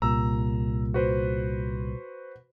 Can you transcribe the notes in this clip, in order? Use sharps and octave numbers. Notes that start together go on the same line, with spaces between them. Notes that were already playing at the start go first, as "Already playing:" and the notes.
C2 A#2 A#5 E6
F#4 B4 C5